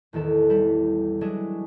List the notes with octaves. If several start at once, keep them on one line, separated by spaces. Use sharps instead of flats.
A1 E2 D#3 A4
G3 E4
F#3 G#3 B3 D4 E4 G#4